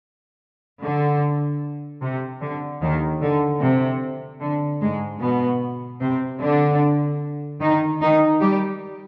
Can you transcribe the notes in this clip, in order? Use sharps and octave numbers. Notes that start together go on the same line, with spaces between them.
D3
C3
D3
D#2 D#3
D3
C3
D3
G#2 G#3
B2 B3
C3 C4
D3 D4
D#3 D#4
D#3 D#4
G3 G4